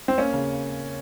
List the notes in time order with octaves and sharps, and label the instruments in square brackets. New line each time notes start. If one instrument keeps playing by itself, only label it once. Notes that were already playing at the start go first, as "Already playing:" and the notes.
[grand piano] C4
A#3 C#4
C#3